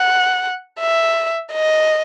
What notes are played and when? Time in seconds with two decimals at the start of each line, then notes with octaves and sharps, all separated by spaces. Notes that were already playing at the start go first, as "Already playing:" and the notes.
Already playing: F#5
0.80 E5
1.53 D#5